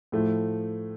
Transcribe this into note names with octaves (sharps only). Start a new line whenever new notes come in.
A2 F3 A3